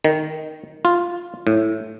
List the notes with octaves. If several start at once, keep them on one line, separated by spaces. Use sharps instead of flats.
D#3
F4
A2